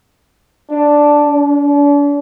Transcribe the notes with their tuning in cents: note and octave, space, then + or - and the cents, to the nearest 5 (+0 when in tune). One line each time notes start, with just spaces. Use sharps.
D4 +0
D4 -40